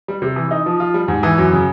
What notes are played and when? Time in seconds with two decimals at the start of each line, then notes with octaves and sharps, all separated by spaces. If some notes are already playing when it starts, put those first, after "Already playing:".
0.08 G3
0.22 C3
0.36 E3
0.51 D#4
0.66 F3
0.80 F4
0.94 G3
1.08 G#2
1.23 E3
1.38 F#2
1.53 C#3